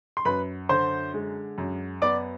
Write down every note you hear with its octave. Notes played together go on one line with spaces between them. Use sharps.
C6
F#2 B4 B5
D3 C5 C6
G#3
F#2
B3 D5 D6